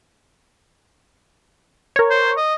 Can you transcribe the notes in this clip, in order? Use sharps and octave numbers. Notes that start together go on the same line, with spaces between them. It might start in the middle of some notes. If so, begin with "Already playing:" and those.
A#4 C#5
C5
D#5